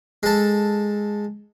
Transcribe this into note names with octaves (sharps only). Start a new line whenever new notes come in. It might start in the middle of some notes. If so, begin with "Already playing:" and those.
G#3 A4